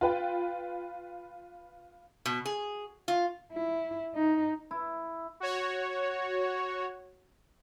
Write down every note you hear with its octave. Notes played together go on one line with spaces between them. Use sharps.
F4 B4 G5
B2
G#4
F4
E4
D#4
E4
F#4 C#5